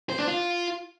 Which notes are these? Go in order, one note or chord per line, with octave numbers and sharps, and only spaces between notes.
C5
D4
F4